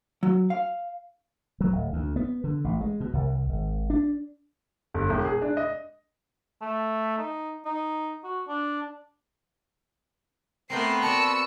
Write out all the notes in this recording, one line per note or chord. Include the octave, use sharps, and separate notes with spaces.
F#3
F5
F#3
D1
D2
B3
D3
A1
G#3
B2
C2
G#1
D4
G1
E1
G#4
D4
D#5
A3
D#4
D#4
F#4
D4
A3 B3 C4 A#4 G5 C7
F#4 A4 D5 A5 E6 C#7